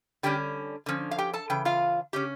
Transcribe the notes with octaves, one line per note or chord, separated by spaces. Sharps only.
D3 G3 C#4 G4 G5
D3 F3 C#4
F5
G4 G5
A4 A5
C#3 E3 G5
F4 F5
C#3 C#4 G4